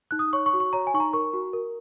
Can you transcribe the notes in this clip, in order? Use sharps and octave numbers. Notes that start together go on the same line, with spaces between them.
D#4 F#6
D#6
C#5 C#6
C#6
F#4
C#6
C#5 A#5
G#5
D#4 C#6
A#5
A#4 C#6
F#4
A#4